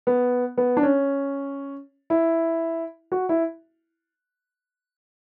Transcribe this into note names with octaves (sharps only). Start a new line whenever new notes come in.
B3
B3
D4
C#4
E4
F#4
E4